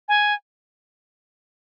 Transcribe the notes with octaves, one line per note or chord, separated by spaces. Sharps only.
G#5